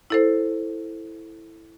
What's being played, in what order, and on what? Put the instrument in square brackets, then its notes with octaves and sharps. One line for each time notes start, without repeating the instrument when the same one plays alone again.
[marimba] E4 A4 C5